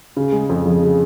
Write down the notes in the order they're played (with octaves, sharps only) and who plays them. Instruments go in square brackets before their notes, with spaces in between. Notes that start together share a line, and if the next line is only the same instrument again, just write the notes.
[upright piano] C#3
G#3
F2
F3
C#3